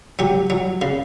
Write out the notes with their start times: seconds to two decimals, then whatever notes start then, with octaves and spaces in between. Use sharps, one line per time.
0.19 F#3 G4
0.50 F#3
0.82 C#3